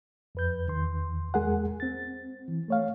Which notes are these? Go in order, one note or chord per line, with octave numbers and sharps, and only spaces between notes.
F2 B4 G6
E2 D#3 C6
E2 G#3 G#4 A#4 F#5
C4 A6
E3
A3 C#5 F5